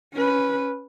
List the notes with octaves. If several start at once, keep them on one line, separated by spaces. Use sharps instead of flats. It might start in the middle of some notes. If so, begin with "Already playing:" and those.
C#4 B4